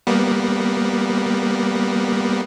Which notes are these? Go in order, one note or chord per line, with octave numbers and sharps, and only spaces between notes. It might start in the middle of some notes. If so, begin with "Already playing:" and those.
G3 A#3 B3